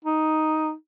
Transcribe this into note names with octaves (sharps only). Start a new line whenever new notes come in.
D#4